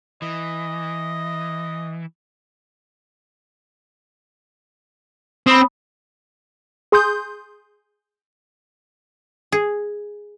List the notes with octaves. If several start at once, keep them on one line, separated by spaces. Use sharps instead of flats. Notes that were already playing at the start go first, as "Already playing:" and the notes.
E3 D#5
C4 B5 D#6
G#4 C6 D#6 G6
G#4